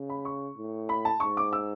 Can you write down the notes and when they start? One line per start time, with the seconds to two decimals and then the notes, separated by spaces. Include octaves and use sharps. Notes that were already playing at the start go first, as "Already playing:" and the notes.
Already playing: C#3
0.10 B5
0.25 C#6
0.57 A2
0.89 B5
1.05 A5
1.20 G#2 C#6
1.37 D6
1.53 E6